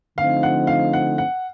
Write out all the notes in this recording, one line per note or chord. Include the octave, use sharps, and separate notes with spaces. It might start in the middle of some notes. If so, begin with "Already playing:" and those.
D3 F3 A3 C4 D#4 F5
F#5
F5
F#5
F#5